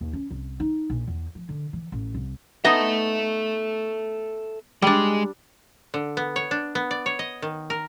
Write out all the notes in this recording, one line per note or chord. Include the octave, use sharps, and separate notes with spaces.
D#2
C#4
C2
D#4
A#1
E2
F3
D3
E3
A1
C2
B3 D#4 A4 D#5 E5
G3 G#3 D4
D3
B3
C#5
D4
B3
D5
C#5
D#5
D#3
A#4